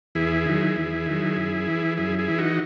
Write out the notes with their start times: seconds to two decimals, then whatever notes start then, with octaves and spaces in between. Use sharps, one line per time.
0.15 E2 E4 G#4
0.46 D#3 F#3
0.76 E2
1.06 D#3 F#3
1.36 F#2
1.67 E3
1.97 F#2 E4 G#4
2.19 E4 G#4
2.28 E3
2.38 D#4 F#4